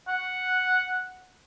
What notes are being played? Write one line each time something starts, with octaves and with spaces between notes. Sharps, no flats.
F#5